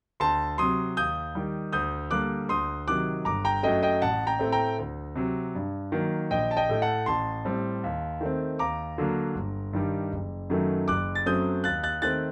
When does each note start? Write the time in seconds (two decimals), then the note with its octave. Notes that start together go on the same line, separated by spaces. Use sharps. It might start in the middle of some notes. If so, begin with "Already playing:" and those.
0.20 D2 A5 C6
0.58 C3 F#3 C6 D#6
0.97 D#2 D#6 G6
1.35 D#3 G3
1.72 D2 D#6 G6
2.11 D3 G3 A#3 D6 F#6
2.49 D2 C6 D#6
2.88 C3 D#3 F#3 D6 F#6
3.25 G1 A#5 D6
3.45 G5 A#5
3.63 F#2 F#3 A3 D#5 G5
3.82 D#5 G5
4.02 A1 F#5 A5
4.27 G5 A#5
4.39 A2 A3 C4
4.52 G5 A#5
4.79 D2
5.16 C3 F#3
5.55 G2
5.92 D#3 F#3 A#3
6.31 A#1 D#5 G5
6.51 A5
6.57 D#5 G5
6.69 A2 A3
6.82 F#5 A5
7.06 A1 A5 C6
7.45 A2 G3 C4
7.84 D#2
8.21 D#3 A3 C4
8.59 D#2 A#5 D6
8.98 D3 F#3 A#3
9.35 G1
9.73 G2 D#3 G3
10.12 F#1
10.50 F#2 D#3 F#3 A3
10.88 F#1 D6 F#6
11.15 A6
11.26 F#2 F#3 A3 C4 D#6 G6
11.64 D#2 F#6 A6
11.83 F#6 A6
12.02 D#3 A3 C4 F#6 A6